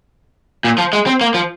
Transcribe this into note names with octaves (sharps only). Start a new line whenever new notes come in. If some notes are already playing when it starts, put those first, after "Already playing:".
A#2
F3
G#3
C4
A#3
F3